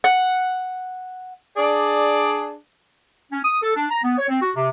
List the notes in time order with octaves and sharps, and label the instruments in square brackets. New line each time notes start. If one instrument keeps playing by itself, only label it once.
[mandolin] F#5
[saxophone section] D4 G#4 D5
[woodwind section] C#4
D#6
A4
D4
A#5
B3
C#5
C4
F#4
C3